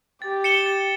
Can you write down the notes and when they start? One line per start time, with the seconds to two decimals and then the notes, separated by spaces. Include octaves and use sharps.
0.22 G4 A6
0.44 C#7 E7 G7
0.66 A6